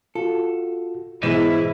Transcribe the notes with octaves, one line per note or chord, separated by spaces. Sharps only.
F4 F#4 A4
G#2 B2 E3 B3 E4 G#4 C5 D#5